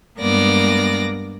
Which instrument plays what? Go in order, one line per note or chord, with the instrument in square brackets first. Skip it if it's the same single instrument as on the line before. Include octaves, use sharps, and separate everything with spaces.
[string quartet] G2 G#3 A#3 B3 D5 A#6